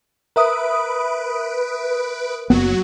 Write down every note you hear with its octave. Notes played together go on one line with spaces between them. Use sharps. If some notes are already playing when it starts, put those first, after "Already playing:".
A#4 B4 E5 D#6 D7
F#1 F#3 A#3 B3 F#4